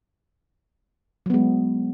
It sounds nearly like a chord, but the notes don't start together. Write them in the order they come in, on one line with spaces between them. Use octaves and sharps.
F#3 B3 G#3